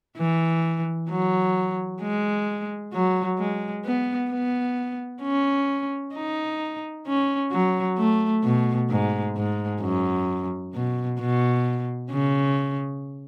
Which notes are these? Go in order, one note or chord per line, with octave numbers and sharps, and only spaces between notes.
E3
F#3
G#3
F#3
G#3
B3
B3
C#4
D#4
C#4
F#3
A3
B2
G#2
G#2
F#2
B2
B2
C#3